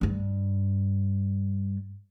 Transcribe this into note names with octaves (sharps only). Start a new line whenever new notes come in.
G2 D4